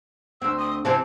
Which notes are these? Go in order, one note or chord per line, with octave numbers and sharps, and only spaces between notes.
D2 C4 E6
D#6
C3 E3 C4 A5